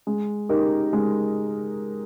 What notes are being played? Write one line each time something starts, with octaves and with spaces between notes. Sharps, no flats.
G#3
D#4 G4 A#4
G#3